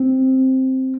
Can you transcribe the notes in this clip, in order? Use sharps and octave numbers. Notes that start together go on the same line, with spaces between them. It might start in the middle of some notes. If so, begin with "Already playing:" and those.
Already playing: C4